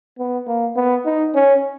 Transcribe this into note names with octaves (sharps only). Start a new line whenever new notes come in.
B3
A#3
B3
D#4
C#4